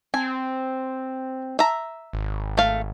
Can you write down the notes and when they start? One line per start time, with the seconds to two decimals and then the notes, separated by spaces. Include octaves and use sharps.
0.14 C4 G#5
1.59 E5 A#5
2.13 G#1
2.57 A3 F5